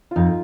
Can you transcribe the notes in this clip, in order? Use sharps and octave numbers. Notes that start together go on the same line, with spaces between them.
F2 D#4 F4